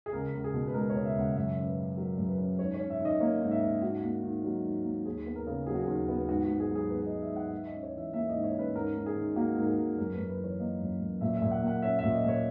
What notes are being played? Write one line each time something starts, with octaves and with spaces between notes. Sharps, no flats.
G#4
C#2 A#4
C#2
G#4
B2
B4
G#3 A#4
C#2 C#5
E5
C#2 F#5
F#2 E5
C#4
B4
C#3
F#3 A#4
F#2
B4
C#4
G#2 C#5
C#4 C#5
E5
D#3 D#5
A#3 C#5
G#2
E5
C#4
G#2 F#4
A#3
D#3
F#3
G#2
A#3
D#2 G#4
B3
A#4
C#3
F#3 G#4
F#4
G#4
D#2
B3
G#2 F#4
F#4
G#2
G#4
F#3
G#4
B3 B4
D#5
G#2
E5
G#2 F#5
G#2 E5
D#5
C#4
C#5
E3 E5
A#3 E5
G#2 D#5
C#5
C#4 B4
G#2 A#4
G#2
G#4
D#3
A#3 F#4
G#2 A#4
G#4
G#2
F#2 A#4
B4
F#2
B4
E3 C#5
A#3 D#5
F#2
F#2
A#2 E5
E5
A#2
F#5
A#3 F#5
C#4 E5
E5
A#2
D#5
A#2 C#5